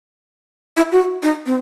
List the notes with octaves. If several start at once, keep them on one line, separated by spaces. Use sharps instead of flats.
E4
F#4
D#4
C4